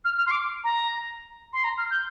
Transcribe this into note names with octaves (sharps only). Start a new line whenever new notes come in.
F6
F6
C6
D6
A#5
C6
A#5
F6
G6